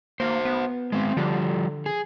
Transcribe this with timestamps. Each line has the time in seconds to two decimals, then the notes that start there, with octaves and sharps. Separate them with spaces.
0.20 A#3 F#4 C5
0.45 B3
0.92 G#3 C4
1.17 D3 F3 G3
1.86 G#4